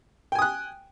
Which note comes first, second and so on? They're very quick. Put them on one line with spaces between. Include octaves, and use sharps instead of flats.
G5 G#5 D#6 F#6